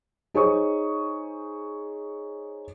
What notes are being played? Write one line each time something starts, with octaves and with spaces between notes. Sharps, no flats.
D#4 G#4 C5 C#5 C#6 D#6